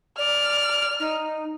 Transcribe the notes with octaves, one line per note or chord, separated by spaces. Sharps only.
D5 F6
D#4